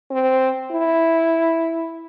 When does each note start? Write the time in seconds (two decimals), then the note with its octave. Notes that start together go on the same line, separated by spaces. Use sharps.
0.11 C4
0.71 E4